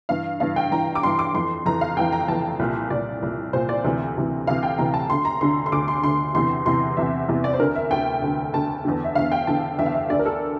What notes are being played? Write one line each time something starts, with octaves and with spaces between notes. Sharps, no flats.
G2 E3 F5
G2 E3 F5
G5
G2 E3 A#5
D6
G2 E3 C6
D6
F2 E3 C6
F2 E3 A#5
F5
F2 E3 G5
A#5
F2 E3 A5
C2 A#2
C2 A#2 D5
C2 A#2
C2 A#2 C5
D5
D2 C3 E3
D2 C3 E3
D2 C3 E3 F5
G5
D2 C3 E3 A#5
A5
D2 D3 C6
A#5
D2 D3 C6
C6
D2 D3 D6
C6
D2 D3 C6
E2 C3 E3 C6
E2 C3 E3 C6
E2 C3 E3 E5
E2 C3 E3
D5
C5
D2 D3 A#4
E5
D2 D3 G5
D2 D3
D2 D3 A5
E2 D3
E5
E2 D3 F5
G5
E2 D3 A5
E2 D3 E5
F5
E5
D2 D3 D5
A#4
A4